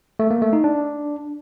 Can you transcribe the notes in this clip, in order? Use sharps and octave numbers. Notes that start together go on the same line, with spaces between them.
A3
A#3
A3
D#4
D4